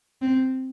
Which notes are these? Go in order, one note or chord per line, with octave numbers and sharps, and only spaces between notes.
C4